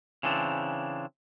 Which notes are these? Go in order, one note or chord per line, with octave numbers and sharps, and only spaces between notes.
C#3 E3 C4 D4